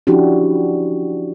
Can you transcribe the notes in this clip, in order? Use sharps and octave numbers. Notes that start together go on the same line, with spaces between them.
F3 C#4 D4 E4 F#4 G4